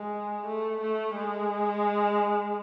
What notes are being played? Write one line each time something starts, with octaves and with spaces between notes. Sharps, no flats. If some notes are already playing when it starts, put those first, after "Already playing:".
Already playing: G#3
A3
A3
G#3